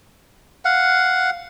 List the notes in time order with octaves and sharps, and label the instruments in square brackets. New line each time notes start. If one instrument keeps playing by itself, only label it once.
[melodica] F5 F#5